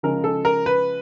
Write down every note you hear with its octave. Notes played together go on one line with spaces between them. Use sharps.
C#3 F3 G#3 C#4 A#4
A4
A#4
B4